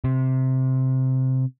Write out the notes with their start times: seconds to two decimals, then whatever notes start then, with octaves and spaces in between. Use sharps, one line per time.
0.04 C3